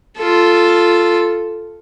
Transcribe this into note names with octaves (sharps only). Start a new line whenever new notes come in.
F4 A4